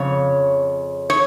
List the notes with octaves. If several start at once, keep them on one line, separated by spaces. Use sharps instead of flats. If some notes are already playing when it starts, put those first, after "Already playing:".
Already playing: F2 C#3 C#5
C#5